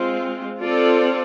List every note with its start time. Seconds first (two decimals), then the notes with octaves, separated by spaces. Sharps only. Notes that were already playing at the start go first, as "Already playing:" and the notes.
Already playing: G#3 C4 F4
0.61 C4 F4 A4 D5